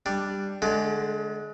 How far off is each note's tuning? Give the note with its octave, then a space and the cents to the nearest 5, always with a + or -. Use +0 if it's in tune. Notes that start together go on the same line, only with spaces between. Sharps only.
G3 +0 D4 +0
D3 +0 G#3 +30 D5 +35